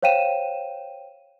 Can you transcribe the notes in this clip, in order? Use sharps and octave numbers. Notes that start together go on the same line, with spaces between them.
C5 C#5 F5 G5 D#7 E7